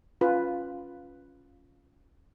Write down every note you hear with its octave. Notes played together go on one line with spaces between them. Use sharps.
C#4 F4 B4